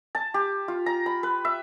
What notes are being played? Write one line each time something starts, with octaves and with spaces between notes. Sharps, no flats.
A5
G4
F4
A#5
B5
B4
E5